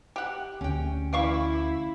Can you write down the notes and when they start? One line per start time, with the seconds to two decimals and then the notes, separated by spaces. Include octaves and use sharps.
0.16 G4 F#5
0.61 D2 C#4 G5
1.13 E3 E4 D5 F5 C#6